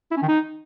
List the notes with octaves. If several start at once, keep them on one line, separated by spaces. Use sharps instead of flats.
E4
C#4
D#3
D#4